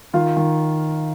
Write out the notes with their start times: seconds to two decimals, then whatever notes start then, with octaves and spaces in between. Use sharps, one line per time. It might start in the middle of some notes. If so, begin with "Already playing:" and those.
0.14 D#3 F4 F5
0.37 D#3